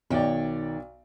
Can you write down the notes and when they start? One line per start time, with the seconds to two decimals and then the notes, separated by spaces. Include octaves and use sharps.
0.10 B1 D#3 C#5 D5 G5